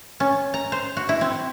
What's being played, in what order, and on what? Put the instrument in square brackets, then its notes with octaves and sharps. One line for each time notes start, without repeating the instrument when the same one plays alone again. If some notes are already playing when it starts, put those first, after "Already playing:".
[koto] C#4
A#5
C5
F#4
E4
C4